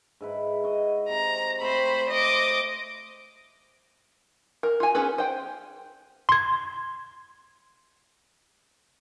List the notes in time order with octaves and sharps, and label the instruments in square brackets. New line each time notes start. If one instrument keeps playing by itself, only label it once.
[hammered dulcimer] G#2 E4 B4
F#4 D#5
[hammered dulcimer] C3 [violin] A#5
[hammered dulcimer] A3 C4 [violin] C5 B5
[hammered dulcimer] C5 [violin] D#5 D6
[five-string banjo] A#4
F4 G#5
B3 C#4 G#4 A4 B4
C5 G5
[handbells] C6 G#6